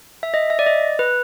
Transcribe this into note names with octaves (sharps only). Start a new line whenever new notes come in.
E5
D#5
E5
D5
D#5
B4